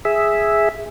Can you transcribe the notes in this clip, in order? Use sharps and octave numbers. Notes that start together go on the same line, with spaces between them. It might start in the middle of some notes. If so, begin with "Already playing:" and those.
G#4 E5